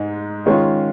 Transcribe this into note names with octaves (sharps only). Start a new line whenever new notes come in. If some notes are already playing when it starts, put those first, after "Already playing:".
Already playing: G#2 G#3 D#4
D#3 G#3 C#4 F4